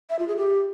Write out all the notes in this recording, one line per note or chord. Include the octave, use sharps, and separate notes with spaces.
E5
F4
G#4
G4